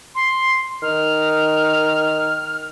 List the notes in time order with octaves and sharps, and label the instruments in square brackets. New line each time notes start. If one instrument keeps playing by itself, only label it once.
[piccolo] C6
[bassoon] D#3 [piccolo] F6